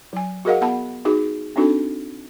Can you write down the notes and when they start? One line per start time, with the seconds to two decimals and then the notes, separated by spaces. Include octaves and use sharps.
0.13 F#3 G#5
0.45 F#4 G#4 A#4 D#5 F5 F#5
0.61 B3 F#5 A5 B5
1.05 D#4 F#4 G#4 D6
1.56 C4 D4 D#4 F#4 A4